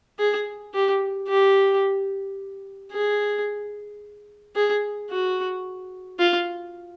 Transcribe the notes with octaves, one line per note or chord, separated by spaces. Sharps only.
G#4
G4
G4
G#4
G#4
F#4
F4